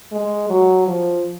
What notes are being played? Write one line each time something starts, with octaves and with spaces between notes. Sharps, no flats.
G#3
F#3
F3